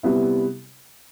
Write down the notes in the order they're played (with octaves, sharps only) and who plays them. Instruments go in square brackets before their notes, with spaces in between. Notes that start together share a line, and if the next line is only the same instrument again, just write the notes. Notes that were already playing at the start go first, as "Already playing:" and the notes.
[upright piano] C3 G3 B3 E4